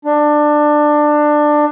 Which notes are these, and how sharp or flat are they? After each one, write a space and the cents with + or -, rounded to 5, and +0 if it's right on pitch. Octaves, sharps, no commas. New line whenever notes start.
D4 +20